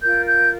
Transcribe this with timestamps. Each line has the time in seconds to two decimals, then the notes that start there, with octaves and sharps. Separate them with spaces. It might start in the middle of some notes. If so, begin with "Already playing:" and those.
0.01 F4 A#4 G6
0.25 G6